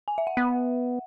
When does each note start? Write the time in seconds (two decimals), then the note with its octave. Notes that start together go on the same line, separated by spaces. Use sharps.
0.08 G#5
0.18 E5
0.27 F#5
0.37 B3 F#5